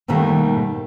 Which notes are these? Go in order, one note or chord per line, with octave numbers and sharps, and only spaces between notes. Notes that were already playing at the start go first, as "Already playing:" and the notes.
G#2 B2 D#3 G3 A3 A#3